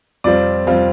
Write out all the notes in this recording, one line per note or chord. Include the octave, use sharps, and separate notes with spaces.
F2 C3 G3 C4 F4 D5
F2 C3 G3 C4 F4